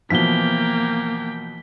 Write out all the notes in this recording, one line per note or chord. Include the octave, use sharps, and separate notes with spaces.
B2 E3 F3 A#3 G5 B6 G7